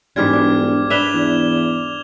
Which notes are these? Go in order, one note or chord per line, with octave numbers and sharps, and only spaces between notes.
E1 G#2 E3 G3 D6 F6 G#6
D4
D4 B4 E5 E7 F7 G7
E2